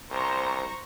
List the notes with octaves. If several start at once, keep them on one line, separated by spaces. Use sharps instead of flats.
C2 C5 A#5 C#6